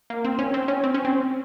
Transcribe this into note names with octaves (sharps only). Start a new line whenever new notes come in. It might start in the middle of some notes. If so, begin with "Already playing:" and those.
A#3
C4
C#4
C4
C#4
C4
C#4
C4